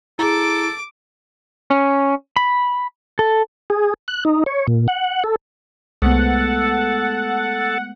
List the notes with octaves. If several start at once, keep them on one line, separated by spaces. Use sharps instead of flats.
E4 G#4 A4 A#5 D6 D7
C#4
B5
A4
G#4
F#6
D#4
C#5
A#2
F#5
A4
C2 G#3 A3 B3 A4 F#5